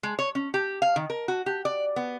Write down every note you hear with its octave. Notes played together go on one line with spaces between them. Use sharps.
G#3
C#5
C#4
G4
F5
D#3
A#4
F#4
G4
D5
B3